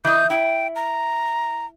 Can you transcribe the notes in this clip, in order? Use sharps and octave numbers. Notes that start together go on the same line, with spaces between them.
E3 D#5 G6
E4 G5
A#5